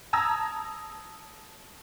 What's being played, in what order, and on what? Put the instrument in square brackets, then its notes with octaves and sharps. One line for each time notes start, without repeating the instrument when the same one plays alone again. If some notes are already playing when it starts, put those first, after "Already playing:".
[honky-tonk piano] A5 A#5 D#6 E6 G#6 A#6